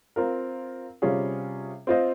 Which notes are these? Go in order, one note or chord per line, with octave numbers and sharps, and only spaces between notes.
C4 F4 A#4
C3 G3 C#4 F4 G#4
C4 F4 C5 D#5